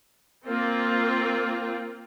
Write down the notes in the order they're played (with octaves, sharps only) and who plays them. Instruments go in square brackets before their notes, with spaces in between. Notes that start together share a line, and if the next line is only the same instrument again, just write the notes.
[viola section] A#3 C4 F4